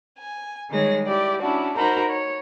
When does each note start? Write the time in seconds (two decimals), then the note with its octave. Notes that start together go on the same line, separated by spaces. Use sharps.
0.19 G#5
0.69 D#3 G3 G#3 G#4 C#5 A#6
1.06 E4 G4 D5
1.40 C#4 D4 E4 F#4
1.77 D#4 F#4 A#4 C5 A#5 B5
2.08 C#5